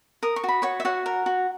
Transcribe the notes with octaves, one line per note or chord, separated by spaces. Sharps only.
A#4 D#6
C#6
F#4 B5
F#4 C#5 C#6
E5
F#4 C#5 F#5
A#4
F#4